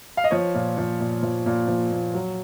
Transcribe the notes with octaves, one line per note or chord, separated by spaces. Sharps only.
F5
D#5
F3 C#5
A#2
F3
A#2
F3
A#2
F3
A#2
F#3